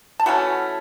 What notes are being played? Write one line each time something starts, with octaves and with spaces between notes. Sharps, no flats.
A5
E3 A3 C#4 F#4 F#5